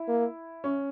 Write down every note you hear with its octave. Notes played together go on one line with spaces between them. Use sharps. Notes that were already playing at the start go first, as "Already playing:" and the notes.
Already playing: E4
A#3
C#4